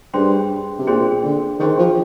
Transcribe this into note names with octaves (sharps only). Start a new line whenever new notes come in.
G2 D4 G#4 C5 G5 C6
C3
A#2 D4 G#4 C5 G5 C6
D3
D#3 D4 G#4 C5 G5 C6
F3